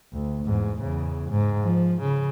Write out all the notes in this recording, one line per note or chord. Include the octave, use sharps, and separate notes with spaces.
D2
E2 G#2
E2 C#3
G#2
F3
C#3